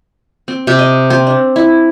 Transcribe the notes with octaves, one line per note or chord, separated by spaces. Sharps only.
C4
C3
D#5
C4
D4
E4